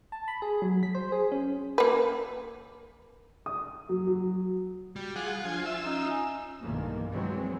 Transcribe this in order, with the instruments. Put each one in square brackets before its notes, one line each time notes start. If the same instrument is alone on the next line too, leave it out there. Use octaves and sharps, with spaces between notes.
[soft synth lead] A5
B5
G#4
F#3
B6
C5
G#4
C#4
[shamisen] A#3 B4
[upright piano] D#6
F#3
F#3
[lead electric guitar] G3
[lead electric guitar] F4 [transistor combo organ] G#4 F#5
[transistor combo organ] F3 G#5 [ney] D4
[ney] E5 [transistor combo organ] E6
[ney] C#4 [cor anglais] D#4
[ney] G#5
[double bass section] B1 G2 D#3 E3 A#3
E3 F#3 G#3 C4